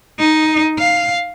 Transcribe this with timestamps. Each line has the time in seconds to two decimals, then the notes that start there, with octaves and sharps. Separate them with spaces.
0.19 D#4
0.79 F5